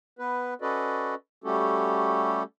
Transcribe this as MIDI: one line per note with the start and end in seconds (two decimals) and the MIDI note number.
0.19 0.54 59
0.19 0.54 71
0.62 1.15 61
0.62 1.15 66
0.62 1.15 69
0.62 1.15 71
0.62 1.15 74
0.62 1.15 75
1.44 2.43 55
1.44 2.43 57
1.44 2.43 61
1.44 2.43 66
1.44 2.43 67
1.44 2.43 69